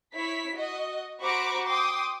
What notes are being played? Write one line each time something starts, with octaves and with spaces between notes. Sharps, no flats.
E4 C#5 B6
F#4 D#5
F#4 C5 A#5 B5 C#6 D6
G5 C6 D6 D#6